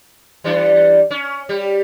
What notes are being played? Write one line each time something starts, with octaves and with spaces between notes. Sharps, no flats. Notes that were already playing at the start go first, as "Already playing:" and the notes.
E3 G3 D4
C#4
G3 G4